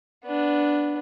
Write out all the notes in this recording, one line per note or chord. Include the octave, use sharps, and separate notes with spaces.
B3 D4